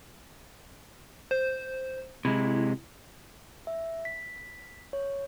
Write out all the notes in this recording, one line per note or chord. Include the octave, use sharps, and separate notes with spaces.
C5
C3 G#3 E4
E5
B6
C#5